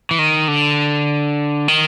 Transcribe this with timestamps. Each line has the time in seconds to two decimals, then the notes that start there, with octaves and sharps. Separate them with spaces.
0.11 E3
0.19 D#3
0.48 D3
1.68 D#3